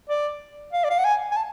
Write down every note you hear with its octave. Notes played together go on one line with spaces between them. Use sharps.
D5
F5
D5
F5
F#5
G#5
G#5
A5